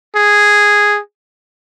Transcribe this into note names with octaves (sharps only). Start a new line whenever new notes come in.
G#4